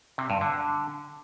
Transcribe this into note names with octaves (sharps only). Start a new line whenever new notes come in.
C3
G2
D3